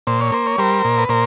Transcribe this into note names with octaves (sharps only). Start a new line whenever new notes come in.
A#2 C5
C#5
A#3 C5
C#5
G3 A#4 C5
A#2
B4
A#2 A#4 C5